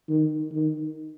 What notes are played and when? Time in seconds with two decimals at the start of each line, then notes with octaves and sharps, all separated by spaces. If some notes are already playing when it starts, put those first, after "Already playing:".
0.09 D#3
0.52 D#3